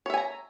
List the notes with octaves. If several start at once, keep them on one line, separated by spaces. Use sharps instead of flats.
C#5 E5 G#5 A#5